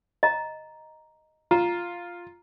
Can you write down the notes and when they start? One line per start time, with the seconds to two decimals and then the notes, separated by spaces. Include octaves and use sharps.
0.23 D#5 A#5
1.51 F4 A#5